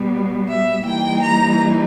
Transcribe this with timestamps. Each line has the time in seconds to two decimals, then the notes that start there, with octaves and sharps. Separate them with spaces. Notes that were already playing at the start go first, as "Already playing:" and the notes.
Already playing: B2 G3 B3
0.49 E5
0.86 E3 G3 A#3 D#4 G5
1.23 A#5